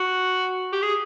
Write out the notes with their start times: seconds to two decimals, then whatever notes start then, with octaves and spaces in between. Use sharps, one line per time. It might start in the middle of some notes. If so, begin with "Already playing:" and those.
Already playing: F#4
0.73 G4
0.82 G#4